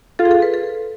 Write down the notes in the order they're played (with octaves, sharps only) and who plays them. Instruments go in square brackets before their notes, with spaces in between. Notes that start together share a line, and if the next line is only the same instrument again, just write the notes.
[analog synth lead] F4 [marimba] A4
[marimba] G#4
A4
B4
A4